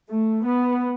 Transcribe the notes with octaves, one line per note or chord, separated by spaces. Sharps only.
A3
B3